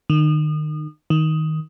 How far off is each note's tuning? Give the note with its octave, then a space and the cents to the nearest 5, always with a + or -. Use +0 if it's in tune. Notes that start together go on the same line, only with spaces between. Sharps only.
D#3 -35
D#3 +10